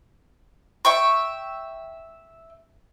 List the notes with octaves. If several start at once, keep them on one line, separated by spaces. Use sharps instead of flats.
E5 G5 C#6